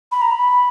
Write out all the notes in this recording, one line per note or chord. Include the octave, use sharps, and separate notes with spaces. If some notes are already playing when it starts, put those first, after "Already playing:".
B5
A#5
B5